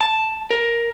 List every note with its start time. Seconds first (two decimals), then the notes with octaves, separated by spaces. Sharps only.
0.01 A5
0.50 A#4